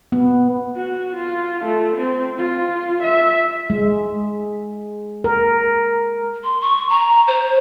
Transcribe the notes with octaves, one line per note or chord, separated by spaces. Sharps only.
B3
F#4
F4
A3
C4
F4
E5
G#3
A#4
C6
C#6
A#5
C5